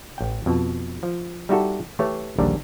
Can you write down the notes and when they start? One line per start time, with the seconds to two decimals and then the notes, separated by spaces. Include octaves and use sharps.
0.18 A1 G5
0.46 F2 B2
1.03 F3
1.49 G3 D#4 E4 F#4 G4 A4
1.99 E3 A3 G4 C#5
2.39 A#1 D#2 D3 G3 A#4